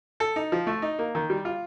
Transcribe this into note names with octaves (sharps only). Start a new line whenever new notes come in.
A4
D#4
F3
A3
D#4
A#3
D#3
G3
F4